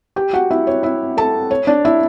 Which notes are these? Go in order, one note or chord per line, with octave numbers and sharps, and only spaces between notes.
G4 G5
F#4 F#5
E4 E5
C#5
E4 E5
A4 A5
C#5
D4 D5
E4 E5